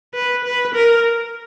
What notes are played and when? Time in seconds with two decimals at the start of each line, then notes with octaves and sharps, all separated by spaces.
0.14 B4
0.44 B4
0.74 A#4